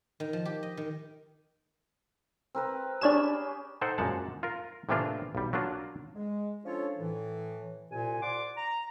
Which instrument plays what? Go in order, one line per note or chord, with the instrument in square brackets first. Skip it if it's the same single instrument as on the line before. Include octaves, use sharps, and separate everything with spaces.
[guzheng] D#3
F3
G4
D#5
D#3
[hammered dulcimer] C4 A#4 B4
[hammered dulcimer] C#4 G4 G#4 [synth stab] D4 C#5 E7
[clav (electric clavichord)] D#4 A4 C5 F#5 G5
F#2 A#2 G#3 F#5 A5
F4 A#4
A2 C3 E3 A#3 D4 F4
B1 G3
F#3 A#3 D4 F4
[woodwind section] G#3
F3 C#4 D4 F4 A4 C#5
A2 E3
C2 A#2 G#5
D5 F#5 C6 D6
A#5